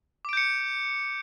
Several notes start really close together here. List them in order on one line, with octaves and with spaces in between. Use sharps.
D6 D7 G6 C#7